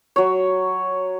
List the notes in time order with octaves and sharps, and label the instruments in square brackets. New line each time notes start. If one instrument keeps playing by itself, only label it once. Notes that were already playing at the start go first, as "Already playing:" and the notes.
[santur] F#3 C#5